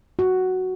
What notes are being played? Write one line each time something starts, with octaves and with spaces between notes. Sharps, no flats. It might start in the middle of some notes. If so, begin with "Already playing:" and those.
F#4